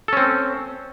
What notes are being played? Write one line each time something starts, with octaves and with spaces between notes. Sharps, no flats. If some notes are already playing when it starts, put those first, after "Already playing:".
C4 C#4 A4